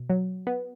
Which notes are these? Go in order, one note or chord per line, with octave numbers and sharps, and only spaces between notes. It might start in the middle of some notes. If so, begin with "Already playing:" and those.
Already playing: B2
F#3
B3